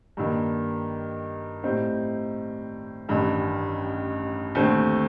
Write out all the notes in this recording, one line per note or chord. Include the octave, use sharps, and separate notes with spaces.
G2 D#3 A#3
A2 G3 C4 D#4
A1 G2 D#3
D#2 D3 A3 C4